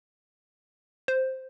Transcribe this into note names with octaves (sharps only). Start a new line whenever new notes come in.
C5